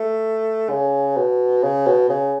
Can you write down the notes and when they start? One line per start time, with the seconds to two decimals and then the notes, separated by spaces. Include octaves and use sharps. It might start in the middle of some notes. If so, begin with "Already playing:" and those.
Already playing: A3
0.70 C#3
1.17 B2
1.63 C#3
1.87 B2
2.09 C#3